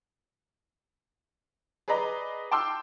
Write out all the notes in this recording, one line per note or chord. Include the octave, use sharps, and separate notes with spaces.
G#4 B4 D5 D#5 A#5
G5 A5 C6 D6 E6 F6